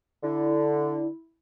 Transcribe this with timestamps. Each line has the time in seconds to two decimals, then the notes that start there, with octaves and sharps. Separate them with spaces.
0.23 D3 E4